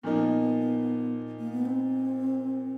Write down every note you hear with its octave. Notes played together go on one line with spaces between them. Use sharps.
A#2 F3 A#3 B3 D#4
A#3
B3
C4